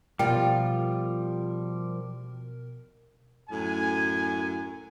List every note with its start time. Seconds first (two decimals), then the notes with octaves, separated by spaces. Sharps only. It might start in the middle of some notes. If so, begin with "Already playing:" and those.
0.19 B2 F3 G3 F4 A#4 D5 G5
3.50 F#2 A2 G#5